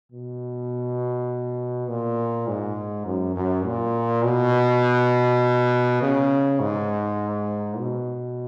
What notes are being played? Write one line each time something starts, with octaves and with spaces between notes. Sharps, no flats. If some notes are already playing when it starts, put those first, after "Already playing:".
B2
A#2
G#2
F#2
F#2
A#2
B2
C#3
G#2
B2